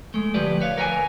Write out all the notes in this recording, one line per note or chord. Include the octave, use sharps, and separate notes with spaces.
G#3 A3
D2 F3 G4 B4 D5
B4 C#5 F5
A#4 B4 G5 G#5